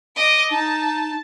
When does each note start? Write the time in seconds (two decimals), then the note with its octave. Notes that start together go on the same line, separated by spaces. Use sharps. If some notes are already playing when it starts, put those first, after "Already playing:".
0.16 D#5 D6
0.50 D#4 A5